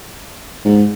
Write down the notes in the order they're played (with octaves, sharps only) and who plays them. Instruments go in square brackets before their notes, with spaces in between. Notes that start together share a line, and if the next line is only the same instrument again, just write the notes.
[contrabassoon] G#2